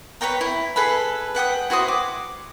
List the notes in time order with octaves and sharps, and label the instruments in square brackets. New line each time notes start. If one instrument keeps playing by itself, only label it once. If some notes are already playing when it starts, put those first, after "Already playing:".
[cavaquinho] B4 C#5 G5 A#5
E4
G#4 A4 B4 B5
B4 F#5 G5 D#6
E4 F#4 C5 D#6
D6